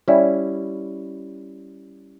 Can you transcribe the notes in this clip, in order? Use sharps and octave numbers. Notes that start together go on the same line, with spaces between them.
G3 C#4 E4